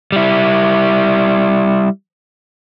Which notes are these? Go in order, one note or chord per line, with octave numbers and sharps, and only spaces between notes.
G3 E4